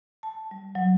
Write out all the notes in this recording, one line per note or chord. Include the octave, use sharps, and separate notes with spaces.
A5
G3
F#3